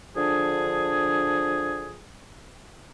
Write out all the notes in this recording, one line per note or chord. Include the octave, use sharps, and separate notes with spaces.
D3 F3 D4 G#4